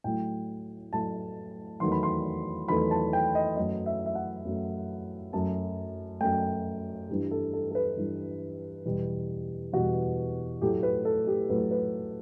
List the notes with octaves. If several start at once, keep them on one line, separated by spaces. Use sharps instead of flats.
A2 F#3 A3 G5
A2 F#3 A3 A5
E2 D#3 F#3 A3 C6
B5
C6
E2 D#3 F#3 A3 B5
A5
G5
D#5
F#2 F#3 A3 D#5
E5
E5
F#5
F#2 F#3 A3
F#2 F#3 A3 A5
F#2 F#3 A3 G5
G2 E3 G3
A4
A4
A4
B4
G2 E3 G3
E2 B2 G3
E2 B2 G3 F#4
A2 F#3 A3 G4
B4
A4
G4
A2 F#3 A3 B4
B4